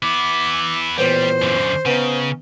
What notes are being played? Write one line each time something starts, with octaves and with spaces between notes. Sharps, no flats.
B3 E4 D6
A#1 E2 A2 G3 C5
F#2 D3
C#3 B3 D#4